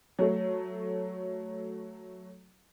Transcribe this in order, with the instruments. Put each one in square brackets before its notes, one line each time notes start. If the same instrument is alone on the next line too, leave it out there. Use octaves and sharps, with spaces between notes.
[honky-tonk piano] F#3 A3